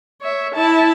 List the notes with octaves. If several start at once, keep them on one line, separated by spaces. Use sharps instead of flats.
C#5 E5
E4 A5